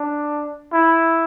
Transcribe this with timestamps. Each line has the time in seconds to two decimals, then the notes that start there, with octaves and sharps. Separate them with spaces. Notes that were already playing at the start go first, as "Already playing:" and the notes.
Already playing: D4
0.73 E4